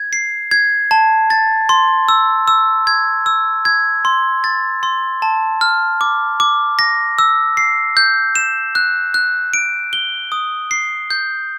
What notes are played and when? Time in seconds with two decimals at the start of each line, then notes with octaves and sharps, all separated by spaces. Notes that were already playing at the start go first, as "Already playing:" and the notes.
Already playing: G#6
0.13 C7
0.51 G#6
0.91 A5
1.30 A6
1.69 C6
2.09 E6
2.48 E6
2.87 G#6
3.26 E6
3.65 G#6
4.05 C6
4.44 A6
4.83 C6
5.22 A5
5.61 F6
6.01 D6
6.40 D6
6.79 A#6
7.19 E6
7.57 C7
7.97 G6
8.35 E7
8.75 F#6
9.14 F#6
9.54 D7
9.93 G7
10.32 D#6
10.71 C7
11.10 G6